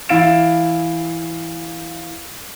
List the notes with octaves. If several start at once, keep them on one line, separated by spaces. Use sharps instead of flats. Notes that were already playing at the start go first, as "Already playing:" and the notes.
E3 E4 F5 A6 D7 E7